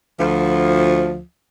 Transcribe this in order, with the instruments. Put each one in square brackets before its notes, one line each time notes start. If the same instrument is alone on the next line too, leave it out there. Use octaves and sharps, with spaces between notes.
[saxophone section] D2 F3